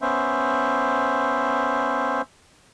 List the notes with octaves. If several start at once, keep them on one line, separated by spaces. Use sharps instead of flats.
B3 C#4 C5 E5